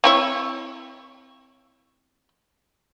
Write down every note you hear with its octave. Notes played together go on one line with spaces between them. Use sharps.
C4 E4 C#5